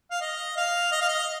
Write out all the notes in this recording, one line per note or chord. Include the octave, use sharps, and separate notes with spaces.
F5
D#5
F5
D#5
F5
D#5